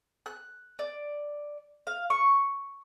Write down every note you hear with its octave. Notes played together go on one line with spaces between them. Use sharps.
F#6
D5
F5
C#6